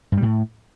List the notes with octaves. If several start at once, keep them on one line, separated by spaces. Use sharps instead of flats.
G2
G3
A2